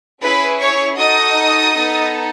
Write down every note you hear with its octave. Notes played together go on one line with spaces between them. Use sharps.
C#4 E4 G#4 B4 B5
C#5 C#6
D#4 F#4 A4 D#5 D#6
B3 D#4 A4